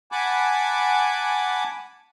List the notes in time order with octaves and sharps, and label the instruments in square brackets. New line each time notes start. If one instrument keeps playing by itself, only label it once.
[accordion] F#5 G#5 A5 B5 D6